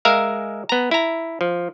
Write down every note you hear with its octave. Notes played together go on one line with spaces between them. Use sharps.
G#3 A#4 E5 F5 A#5
B3 A#5
E4 A#5
F3